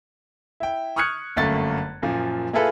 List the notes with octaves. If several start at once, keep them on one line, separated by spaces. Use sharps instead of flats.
E4 G5
C#6 D#6 F6 F#6 G#6 C#7
G1 F#2 A3 A#3 A6
F#2 A#2 F3
A#3 E4 F4 G#4 A4 B4